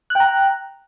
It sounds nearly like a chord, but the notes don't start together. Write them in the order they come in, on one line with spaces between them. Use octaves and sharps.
F#6 G5 A#5